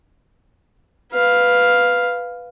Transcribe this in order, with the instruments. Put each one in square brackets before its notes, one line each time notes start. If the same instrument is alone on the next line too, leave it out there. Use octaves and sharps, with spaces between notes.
[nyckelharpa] B4 F5